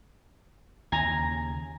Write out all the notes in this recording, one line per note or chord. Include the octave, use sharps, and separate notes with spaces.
D#2 C#3 G#5 A#5